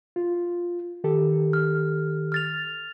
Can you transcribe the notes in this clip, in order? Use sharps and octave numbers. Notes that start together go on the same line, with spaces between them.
F4
D#3 G4 A4
F6
F6 A6 F7